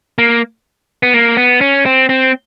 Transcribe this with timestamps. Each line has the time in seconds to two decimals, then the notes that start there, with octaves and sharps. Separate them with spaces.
0.18 A#3
1.03 B3
1.14 A#3
1.37 B3
1.61 C#4
1.86 C4
2.09 C4